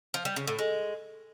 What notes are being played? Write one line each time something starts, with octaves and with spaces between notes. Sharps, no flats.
F3
G3
C#3
A2
G#3